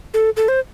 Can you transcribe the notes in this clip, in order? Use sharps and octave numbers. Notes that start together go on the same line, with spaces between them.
A4
A4
C5